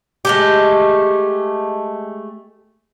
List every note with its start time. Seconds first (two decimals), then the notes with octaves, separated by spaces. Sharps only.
0.25 G#3 A3 G4